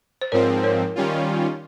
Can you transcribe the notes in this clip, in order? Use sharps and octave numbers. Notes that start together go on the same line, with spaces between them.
C5
G#2 F3 C4 A#4 C#5
A#4 C#5
D#3 G3 C#4 F4